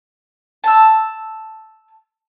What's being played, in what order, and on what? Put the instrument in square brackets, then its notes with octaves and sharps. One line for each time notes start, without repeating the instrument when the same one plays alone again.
[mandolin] A5 E6